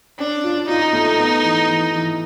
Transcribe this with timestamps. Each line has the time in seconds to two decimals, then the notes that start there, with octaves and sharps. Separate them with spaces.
0.19 C#4 D4
0.44 F4
0.68 D#4 F4
0.93 A3
1.18 B3
1.43 E3
1.68 E3
1.93 E3